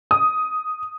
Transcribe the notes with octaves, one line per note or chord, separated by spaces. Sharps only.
D#6